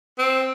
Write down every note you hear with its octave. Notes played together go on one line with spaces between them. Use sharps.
C4